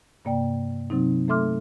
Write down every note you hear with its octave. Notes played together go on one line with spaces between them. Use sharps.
G2 C3 A#3 D5 G5
C3 F#3 C4 D#4
A3 A4 E5 C6 D6 F6